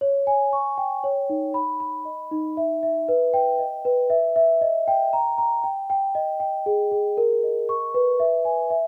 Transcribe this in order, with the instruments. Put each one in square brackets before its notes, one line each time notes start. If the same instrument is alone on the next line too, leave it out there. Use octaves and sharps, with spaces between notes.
[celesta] C#5
G#5
C#6
G5
C#5
D#4
B5
B5
D#5
D#4
E5
E5
B4
G5
D#5
B4
E5
E5
D#5
G5
A#5
A#5
G5
G5
D#5
G5
G#4
G#4
A#4
D#5
C#6
B4
E5
G#5
E5